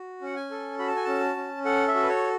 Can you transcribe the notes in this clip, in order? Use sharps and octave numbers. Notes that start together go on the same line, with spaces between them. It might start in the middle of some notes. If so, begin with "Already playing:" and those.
Already playing: F#4
C#4 F#5
G#5
A4
F#4 B5
A5
G#5
C#4 A5
C#4
A4 F#5
E5
F#4
B4
C#5